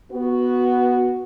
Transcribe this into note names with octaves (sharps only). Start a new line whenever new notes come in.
B3 F#4